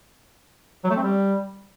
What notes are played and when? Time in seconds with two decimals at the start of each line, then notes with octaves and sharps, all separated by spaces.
0.84 F#3
0.90 A3
0.96 C4
1.03 G3